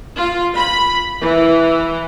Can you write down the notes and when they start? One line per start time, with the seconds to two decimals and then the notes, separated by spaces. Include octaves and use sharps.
0.17 F4
0.57 B5
1.22 E3